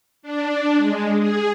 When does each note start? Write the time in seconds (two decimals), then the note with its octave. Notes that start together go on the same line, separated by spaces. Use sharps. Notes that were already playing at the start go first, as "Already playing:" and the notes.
0.22 D4
0.77 G#3
1.19 G#4